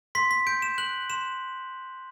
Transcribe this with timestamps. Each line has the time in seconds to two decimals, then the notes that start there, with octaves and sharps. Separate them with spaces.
0.15 C6 B6
0.31 B6
0.47 G6 D7
0.62 E7
0.78 F#6 F#7
1.10 C6 E7